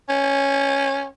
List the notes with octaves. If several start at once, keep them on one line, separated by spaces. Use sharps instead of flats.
C#4